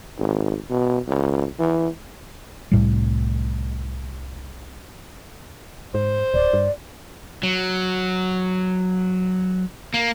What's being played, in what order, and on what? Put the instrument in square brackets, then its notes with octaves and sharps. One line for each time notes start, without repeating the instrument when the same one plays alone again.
[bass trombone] G#1
B2
C#2
E3
[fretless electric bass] C2 A2 G3
[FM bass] G#2 [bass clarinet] C5
[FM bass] D1 [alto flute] D5
[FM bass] G2
[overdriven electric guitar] F#3
A#3